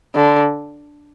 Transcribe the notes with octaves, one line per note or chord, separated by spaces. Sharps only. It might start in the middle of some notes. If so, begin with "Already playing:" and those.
D3